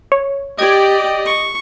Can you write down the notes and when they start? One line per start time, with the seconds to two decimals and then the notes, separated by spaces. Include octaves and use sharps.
0.12 C#5
0.59 G4 D5 D#5 G5 G#6
1.26 C#6